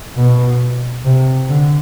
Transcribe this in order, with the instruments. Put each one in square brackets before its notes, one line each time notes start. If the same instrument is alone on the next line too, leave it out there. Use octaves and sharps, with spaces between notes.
[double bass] B2
C3
D3